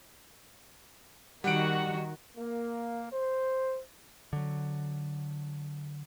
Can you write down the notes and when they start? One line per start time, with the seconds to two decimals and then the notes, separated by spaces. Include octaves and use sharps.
1.44 D#3 G3 F#4 F#5 D7
2.36 A#3
3.13 C5
4.33 D3 F#3